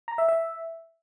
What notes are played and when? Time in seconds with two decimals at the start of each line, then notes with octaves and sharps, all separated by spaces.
0.08 A#5
0.18 E5
0.29 E5